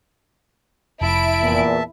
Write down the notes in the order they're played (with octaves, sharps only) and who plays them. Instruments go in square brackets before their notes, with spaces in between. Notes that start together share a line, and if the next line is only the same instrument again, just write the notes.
[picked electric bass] F1 [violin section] E4 D7 [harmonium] E5 A5
[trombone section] E2 A#2